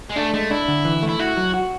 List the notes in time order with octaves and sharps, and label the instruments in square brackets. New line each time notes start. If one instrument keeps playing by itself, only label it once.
[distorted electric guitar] G#3
[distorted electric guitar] A3 [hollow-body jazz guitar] D4
[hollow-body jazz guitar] G#3 [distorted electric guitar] A3
[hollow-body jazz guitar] D4 [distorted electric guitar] E4
[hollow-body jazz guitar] D3
E3
A3
[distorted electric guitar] E4
[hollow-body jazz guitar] E4 [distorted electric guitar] F#4
[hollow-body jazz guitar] F#3
F#4